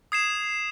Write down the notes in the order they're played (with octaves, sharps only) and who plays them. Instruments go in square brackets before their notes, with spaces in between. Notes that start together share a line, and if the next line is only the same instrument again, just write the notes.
[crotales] D#6 G#6 C7 E7